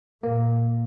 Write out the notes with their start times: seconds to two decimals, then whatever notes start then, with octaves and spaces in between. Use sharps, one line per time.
0.23 A#2 A#3